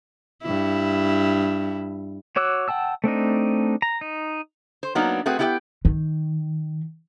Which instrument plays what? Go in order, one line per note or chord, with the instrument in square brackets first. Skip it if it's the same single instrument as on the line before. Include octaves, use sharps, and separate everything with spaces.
[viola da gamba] G2 E4
[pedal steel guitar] F#4 C#5 D6 E6 F#6
F#5 G5 A5 E6
A3 C4 D4 D#4
A#5
D#4
[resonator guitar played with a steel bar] C5
F#3 A#3 B3 D4 D#4
A3 C4 F#4 G#4 B4
B3 E4 G4 D#5 G5
[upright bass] D#3